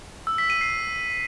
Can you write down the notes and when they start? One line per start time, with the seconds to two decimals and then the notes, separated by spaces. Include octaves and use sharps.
0.27 E6
0.38 B6
0.50 D#7
0.61 C7